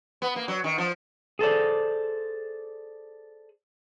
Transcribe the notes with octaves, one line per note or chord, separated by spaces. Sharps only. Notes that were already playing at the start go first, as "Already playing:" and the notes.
B3
A#3
F#3
D#3
F3
G#4 A4 C5 D5